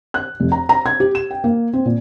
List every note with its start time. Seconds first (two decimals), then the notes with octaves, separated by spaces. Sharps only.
0.14 F#6
0.40 F1
0.52 A#5
0.69 A#5
0.86 G#6
1.00 G4
1.15 E7
1.31 G5
1.44 A#3
1.73 C4
1.86 A#2